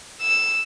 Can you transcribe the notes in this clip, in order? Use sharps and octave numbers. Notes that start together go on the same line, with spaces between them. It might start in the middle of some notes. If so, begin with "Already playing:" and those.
E6